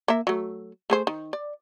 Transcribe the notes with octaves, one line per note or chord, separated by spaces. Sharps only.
A#3 A#4 E5
F#3 A3
A3 G#4 C5
D#3
D5